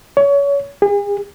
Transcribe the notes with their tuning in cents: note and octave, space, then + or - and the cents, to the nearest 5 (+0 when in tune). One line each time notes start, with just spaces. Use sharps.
C#5 +25
G#4 -40